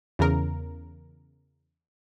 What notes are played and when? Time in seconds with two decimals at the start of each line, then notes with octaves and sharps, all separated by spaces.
0.19 E2 C#3 A#4